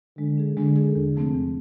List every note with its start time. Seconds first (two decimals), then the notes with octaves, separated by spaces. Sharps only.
0.18 D3 G#3
0.38 D4 G#4
0.57 D3 G#3
0.76 G#4
0.81 D4
0.95 E2 D3
1.16 C3 F3 A3 C4
1.34 E2